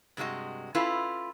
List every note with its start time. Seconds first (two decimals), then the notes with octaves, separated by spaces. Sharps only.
0.17 G2 C3 G#3 F#4 D#5
0.75 C#4 E4 F4 A4 B4